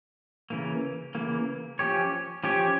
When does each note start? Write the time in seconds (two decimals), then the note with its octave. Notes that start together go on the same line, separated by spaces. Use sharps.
0.50 C#3 E3 A#3
1.15 C#3 E3 A#3
1.79 F3 C#4 G4 C#5
2.44 F3 C#4 G4 C#5